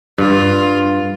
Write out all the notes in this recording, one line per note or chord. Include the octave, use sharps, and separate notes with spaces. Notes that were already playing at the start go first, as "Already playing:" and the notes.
G2 F4